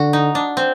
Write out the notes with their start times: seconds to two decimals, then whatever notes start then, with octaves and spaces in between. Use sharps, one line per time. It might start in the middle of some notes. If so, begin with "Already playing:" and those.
Already playing: D3 F#4
0.13 D#4
0.35 D4
0.57 C4